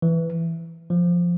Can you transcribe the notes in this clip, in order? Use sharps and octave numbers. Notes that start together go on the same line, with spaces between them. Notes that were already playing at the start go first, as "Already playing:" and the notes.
E3
F3